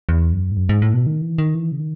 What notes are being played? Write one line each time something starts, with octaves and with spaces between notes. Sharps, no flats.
E2
F#2
G#2
F#2
G#2
A2
B2
D#3
E3
D#3
E3
C#3
D#3